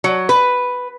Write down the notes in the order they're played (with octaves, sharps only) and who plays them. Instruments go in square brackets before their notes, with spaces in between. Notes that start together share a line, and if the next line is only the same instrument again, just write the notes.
[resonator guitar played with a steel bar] F#3
B4